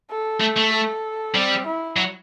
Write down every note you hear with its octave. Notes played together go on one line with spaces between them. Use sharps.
A4
A3
A3
A4
G3 C4
E4
F#3